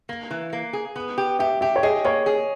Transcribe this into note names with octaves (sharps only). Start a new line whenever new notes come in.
A#3
E3
A#3
G#4
B3
G4
G4 E5
G4 E5
C#5
G#4 D#5
A#3 C#5
G#4